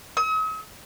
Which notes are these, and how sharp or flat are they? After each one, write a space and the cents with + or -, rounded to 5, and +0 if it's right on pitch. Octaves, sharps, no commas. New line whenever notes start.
D#6 +45